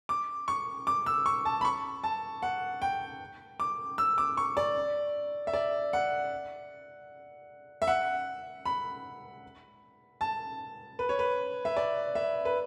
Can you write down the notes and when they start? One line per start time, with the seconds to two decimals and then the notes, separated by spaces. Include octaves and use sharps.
0.09 D6
0.48 C#6
0.87 D6
1.06 E6
1.26 C#6
1.45 A5
1.61 B5
1.65 C#6
2.04 A5
2.42 F#5
2.82 G5
3.60 D6
3.98 E6
4.18 D6
4.37 C#6
4.57 D5
5.47 E5
5.53 D5
5.93 F#5
7.82 E5
7.87 F#5
8.66 B5
10.21 A5
10.99 B4
11.09 C#5
11.19 B4
11.65 E5
11.77 D5
12.15 E5
12.45 B4